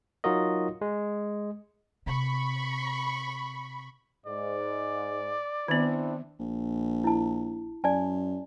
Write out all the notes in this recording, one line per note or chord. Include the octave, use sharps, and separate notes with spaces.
F#3 D#4 F4 F#4 A#4 D#5
G#3
C3 B5 C#6
G#2 D5
D#3 B3 C4 D4 E4
A#1
E4 A5
F#2 D5 G#5 A5